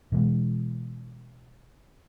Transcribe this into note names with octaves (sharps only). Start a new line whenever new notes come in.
B2 E3 G#3